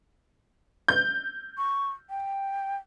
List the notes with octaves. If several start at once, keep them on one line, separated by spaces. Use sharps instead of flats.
G6
C#6
G5